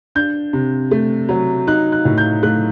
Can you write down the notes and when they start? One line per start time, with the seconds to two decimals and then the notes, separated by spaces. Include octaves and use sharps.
0.15 D4 G6
0.53 C3
0.91 A3
1.29 F#3
1.67 D#4 F#6
1.92 F#6
2.05 A2
2.18 G6
2.43 A3 F#6